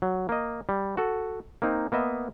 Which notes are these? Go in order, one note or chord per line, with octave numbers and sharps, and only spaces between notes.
F#3
A#3 D#5
G3
F#4 A4
A#3 C4 D#4
A#3 B3 D#5 E5